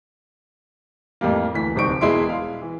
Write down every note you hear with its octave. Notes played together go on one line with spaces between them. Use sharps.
F2 A2 G3 A#3
D2 E3 B6
D1 C2 C4 D#4 C#6 D7
E1 G#3 E4 E5 C6 D7
F5
E3